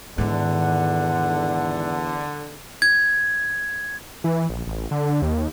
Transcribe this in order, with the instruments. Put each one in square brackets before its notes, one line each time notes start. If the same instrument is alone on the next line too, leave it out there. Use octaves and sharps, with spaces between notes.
[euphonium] E2 [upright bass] G#2 D#3 [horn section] D3 [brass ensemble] F#5
[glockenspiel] G#6
[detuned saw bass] E3
A#1
A1
D3
D#2